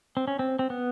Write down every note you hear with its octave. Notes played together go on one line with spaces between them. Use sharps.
C4
C#4
C4
C4
B3